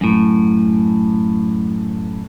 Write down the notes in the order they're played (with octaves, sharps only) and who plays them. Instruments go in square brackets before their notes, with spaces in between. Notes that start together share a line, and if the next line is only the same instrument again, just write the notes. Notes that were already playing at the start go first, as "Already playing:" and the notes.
[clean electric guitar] F#2 A2